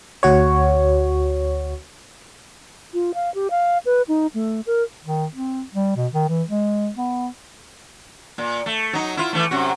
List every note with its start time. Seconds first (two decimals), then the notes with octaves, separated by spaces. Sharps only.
0.23 D2 F#4 C#5
2.94 F4
3.14 F5
3.35 G4
3.50 F5
3.85 B4
4.08 D#4
4.34 A3
4.67 A#4
5.04 D#3
5.34 C4
5.74 G3
5.96 B2
6.13 D#3
6.29 E3
6.50 G#3
6.97 B3
8.38 A#2
8.66 A3
8.93 F#3 D#4
9.17 E4 F4
9.33 E3 A3
9.51 F#2 C3 F#4